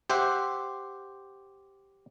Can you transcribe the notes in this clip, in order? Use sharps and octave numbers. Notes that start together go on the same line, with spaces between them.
G4 C5 E5 F#5